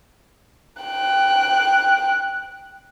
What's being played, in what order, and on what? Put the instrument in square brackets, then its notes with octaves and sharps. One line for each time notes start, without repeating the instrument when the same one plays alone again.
[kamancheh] G5 F#6